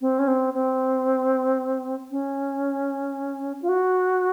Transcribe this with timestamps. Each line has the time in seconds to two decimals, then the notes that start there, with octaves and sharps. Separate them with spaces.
0.01 C4
0.19 C#4
0.28 C4
0.54 C4
2.11 C#4
3.62 F4
3.69 F#4